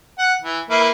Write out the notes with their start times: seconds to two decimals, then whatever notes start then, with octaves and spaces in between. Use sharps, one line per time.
0.19 F#5
0.42 E3
0.70 A#3 E4 B4